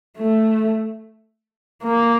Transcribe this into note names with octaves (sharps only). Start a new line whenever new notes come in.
A3
A#3